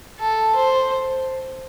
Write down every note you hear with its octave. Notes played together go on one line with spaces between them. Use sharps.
A4
C5